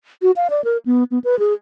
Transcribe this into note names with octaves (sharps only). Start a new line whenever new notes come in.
F#4
F5
D5
A#4
B3
B3
B4
G#4